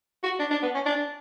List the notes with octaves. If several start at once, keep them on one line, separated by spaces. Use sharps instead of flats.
F#4
D4
D4
B3
C#4
D4